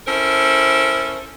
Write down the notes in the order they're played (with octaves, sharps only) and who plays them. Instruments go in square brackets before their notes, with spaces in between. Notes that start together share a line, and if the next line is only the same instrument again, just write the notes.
[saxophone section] C#4 E4 A4 A#4 C5